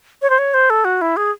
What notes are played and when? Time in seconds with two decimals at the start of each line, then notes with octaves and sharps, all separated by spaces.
0.22 C#5
0.30 C5
0.39 C#5
0.54 C5
0.70 A4
0.85 F#4
1.01 E4
1.17 G#4